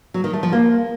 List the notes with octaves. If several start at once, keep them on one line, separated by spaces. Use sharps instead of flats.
F#3
D#3
A3
F3
A#3